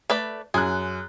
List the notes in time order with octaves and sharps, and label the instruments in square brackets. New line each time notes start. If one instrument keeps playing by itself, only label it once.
[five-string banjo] A3 B4 D5
[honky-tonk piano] F#2 F#6 [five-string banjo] G#4